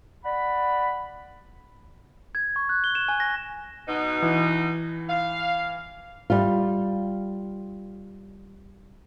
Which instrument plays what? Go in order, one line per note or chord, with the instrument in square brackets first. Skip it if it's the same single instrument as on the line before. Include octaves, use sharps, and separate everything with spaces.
[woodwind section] D5 F#5 B5
[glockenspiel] G#6
C#6
F#6
G7
E7
G#5
A#6
[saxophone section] B2 D#4
[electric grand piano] E3
[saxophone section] F5
[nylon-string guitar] G3 F4